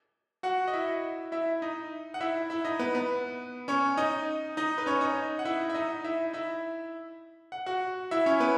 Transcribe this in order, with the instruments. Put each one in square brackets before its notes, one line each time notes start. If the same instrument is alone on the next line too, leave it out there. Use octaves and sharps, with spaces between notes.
[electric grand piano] F#4 F#5
D#5
E4 E5
E4 E5
D#4 D#5
F#5
E4 E5
E4 E5
D#4 D#5
B3 B4
B3 B4
C#4 C#5
D#4 D#5
D#4 D#5
B4
C#4 C#5
D#4 D#5
F#5
E4 E5
E5
D#4 D#5
E4 E5
E4 E5
F#5
F#4 F#5
E4 E5
C#4 C#5
B3 B4